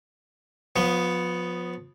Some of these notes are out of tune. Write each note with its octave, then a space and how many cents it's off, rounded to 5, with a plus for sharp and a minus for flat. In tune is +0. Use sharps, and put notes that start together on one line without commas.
F3 +30 B3 +0